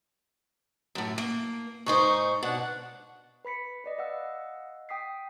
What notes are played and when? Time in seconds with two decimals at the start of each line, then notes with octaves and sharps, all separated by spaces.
0.95 F#2 A2
1.18 A#3
1.86 G#2 D#4 C5 C#6
2.43 B2 D4 F#5
3.45 B4 B5 B6 C#7
3.84 B4 D5 D#5
3.99 D#5 F5 F#5 E6
4.89 G5 D#6 B6 C7